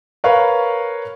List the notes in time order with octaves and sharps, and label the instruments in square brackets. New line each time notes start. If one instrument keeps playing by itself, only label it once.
[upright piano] A#4 B4 C#5 F5